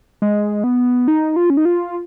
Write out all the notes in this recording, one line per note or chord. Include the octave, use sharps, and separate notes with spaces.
G#3
B3
D#4
F4
C#4
D#4
F4